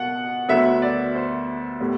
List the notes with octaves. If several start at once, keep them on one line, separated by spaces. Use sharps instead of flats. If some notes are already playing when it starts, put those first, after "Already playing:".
Already playing: B2 F#5
D2 D3 F#3 B3 E5
D5
C5
A2 G3 B3